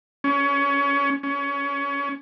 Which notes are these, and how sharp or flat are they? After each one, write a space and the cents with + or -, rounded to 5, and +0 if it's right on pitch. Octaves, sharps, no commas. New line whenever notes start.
C#4 +25
C#4 +25